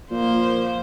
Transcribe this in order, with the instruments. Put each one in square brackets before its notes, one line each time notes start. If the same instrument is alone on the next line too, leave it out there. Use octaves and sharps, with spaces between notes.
[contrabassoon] A#2 [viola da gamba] F3 C5 [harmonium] A#3